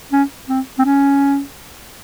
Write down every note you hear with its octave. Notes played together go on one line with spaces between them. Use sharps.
C#4
C4
C4
C#4